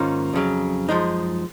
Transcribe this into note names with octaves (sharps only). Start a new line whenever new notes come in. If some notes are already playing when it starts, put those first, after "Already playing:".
Already playing: G#2 D#3 A#3 C#4 F4
F2 C#3 F#3
F#2 F3 G#3 D#4